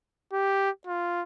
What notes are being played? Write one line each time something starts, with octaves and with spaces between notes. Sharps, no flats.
G4
F4